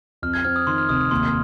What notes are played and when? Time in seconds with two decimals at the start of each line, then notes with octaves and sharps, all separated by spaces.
0.22 F2 F6
0.34 G#6
0.45 C4 F6
0.56 D#6
0.67 D#3 C6
0.78 F6
0.89 F1 D#6
1.00 D#6
1.11 D#2 C6